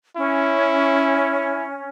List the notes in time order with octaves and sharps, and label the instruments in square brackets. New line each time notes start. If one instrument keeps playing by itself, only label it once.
[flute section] C#4 [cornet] E4